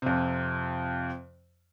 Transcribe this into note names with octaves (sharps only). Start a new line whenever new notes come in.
F2 C3